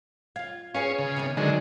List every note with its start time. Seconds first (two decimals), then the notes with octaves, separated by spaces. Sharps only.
0.36 F4 F5 G#6
0.74 C#4 G#4 B4 C#5 F5 G#5 C7
0.99 C#3
1.16 C3 D#3 B3
1.37 D3 D#3 F#3 G#3 B3